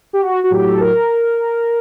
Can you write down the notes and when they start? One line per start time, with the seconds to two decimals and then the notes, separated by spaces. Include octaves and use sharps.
0.13 G4
0.22 F#4
0.44 F#4
0.51 A2 F#3 G4
0.68 A4
0.80 A#4